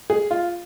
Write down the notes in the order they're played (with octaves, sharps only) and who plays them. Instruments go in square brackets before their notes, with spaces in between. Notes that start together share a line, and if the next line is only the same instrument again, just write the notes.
[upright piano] G#4
F4